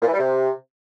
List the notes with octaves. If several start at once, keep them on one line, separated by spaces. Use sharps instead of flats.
A#2
E3
G3
C3